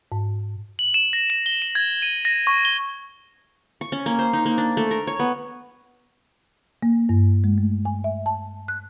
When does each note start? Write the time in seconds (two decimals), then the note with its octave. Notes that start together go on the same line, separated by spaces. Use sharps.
0.12 G#2
0.79 F#7
0.94 E7
1.13 A#6
1.30 E7
1.46 G7
1.62 E7
1.75 G#6
2.02 D#7
2.25 A#6
2.47 C#6
2.65 G7
3.81 C#6
3.92 C#4
4.06 A#3
4.19 C5
4.33 D#4
4.45 A#3
4.58 D4
4.77 A3
4.91 A#4
5.07 C#5
5.19 B3
6.83 A#3
7.09 G2
7.44 G#3
7.58 A3
7.85 G#5
8.04 E5
8.26 A5
8.68 F#6